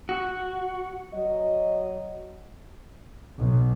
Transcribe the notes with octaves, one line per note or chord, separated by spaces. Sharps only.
F#4
F#3 D#5
B1